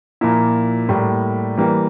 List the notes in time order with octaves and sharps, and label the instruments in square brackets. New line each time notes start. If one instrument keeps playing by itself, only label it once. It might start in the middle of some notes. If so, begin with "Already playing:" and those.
[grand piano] A#2 F3 A#3 E4
A2 G3 A#3
E3 G3 A#3